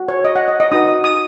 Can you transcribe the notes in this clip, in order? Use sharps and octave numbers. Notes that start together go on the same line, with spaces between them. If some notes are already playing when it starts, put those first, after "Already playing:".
Already playing: F#4
C#5
D#5
F#5
D#5
D#5
D#4 F#4 B4 D#6
D#6
D#6